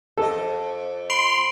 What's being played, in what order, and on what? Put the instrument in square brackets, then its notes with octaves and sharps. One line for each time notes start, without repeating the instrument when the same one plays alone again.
[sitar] F2 D#5 [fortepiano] A4
[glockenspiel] B5 D7 F#7 [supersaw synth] C6